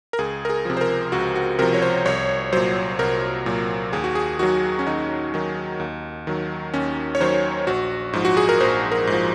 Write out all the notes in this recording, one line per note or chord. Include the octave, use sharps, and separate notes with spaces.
A#4
C#2 G#4
A#4
G#4
C3 F3
C5
A#4
C#2 F#4
F#4
C3 F3 A#4
C#5
C5
C2 C#5
A#2 F#3 C5
C2 A#4
A#2 F#3
D#2 G#4
F#4
G#4
D#3 F#3 F#4
C#4
D#2 D#4
D#3 F#3
D#2
D#3 F#3
D#2 C#4
C#5
D#3 F#3 C5
A#1 F#4
G#2 F3
F#4
G#4
A#4
A#1 C5
A#4
G#2 F3